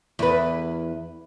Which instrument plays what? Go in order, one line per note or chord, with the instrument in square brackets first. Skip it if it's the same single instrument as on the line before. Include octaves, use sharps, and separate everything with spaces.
[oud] E2 B4